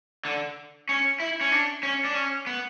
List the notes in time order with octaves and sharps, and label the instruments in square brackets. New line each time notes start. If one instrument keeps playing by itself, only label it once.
[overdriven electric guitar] D3
C#4
E4
C#4
D4
C#4
D4
C#4
B3